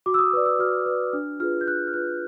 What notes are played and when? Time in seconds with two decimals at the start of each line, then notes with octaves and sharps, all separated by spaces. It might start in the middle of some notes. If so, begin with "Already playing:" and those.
0.06 F#4 D6
0.14 E6
0.19 D#6
0.33 B4 D5
0.46 E6
0.59 F#4 F6
0.86 B4 D5
1.13 D4 F6
1.40 F4 G#4 B4 F6
1.61 G6
1.67 D4 F#6
1.87 F6
1.93 F4 G#4 B4 F#6